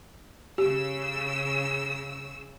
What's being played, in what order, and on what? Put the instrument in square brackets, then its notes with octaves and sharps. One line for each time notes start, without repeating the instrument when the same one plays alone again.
[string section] C#3 E6 [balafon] G4